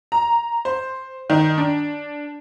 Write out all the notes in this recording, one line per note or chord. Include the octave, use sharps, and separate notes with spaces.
A#5
C5
D#3
D4